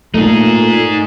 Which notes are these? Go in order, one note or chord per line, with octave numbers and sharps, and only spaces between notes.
A#2 A3 D#4 G#4